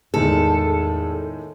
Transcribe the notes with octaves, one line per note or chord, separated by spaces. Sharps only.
E2 A2 D#3 G#3 A4